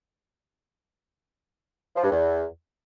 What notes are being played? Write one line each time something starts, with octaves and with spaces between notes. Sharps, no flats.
F3
G2
E2